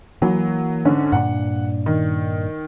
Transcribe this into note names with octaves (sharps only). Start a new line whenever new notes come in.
E3 F#3 A#3
G#2 D3 C#4
G2 A#2 D4 F#5
D#3